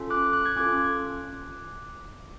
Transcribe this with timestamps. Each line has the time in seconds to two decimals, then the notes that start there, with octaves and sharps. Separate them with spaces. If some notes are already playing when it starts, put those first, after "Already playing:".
Already playing: C#4 F4 A4
0.10 D6 F#6
0.33 F#6
0.46 G#6
0.56 C#4 F4 A4 D6 F#6